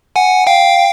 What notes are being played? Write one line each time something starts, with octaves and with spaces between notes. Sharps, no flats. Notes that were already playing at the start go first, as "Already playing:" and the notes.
F#5 G#5
F5 G5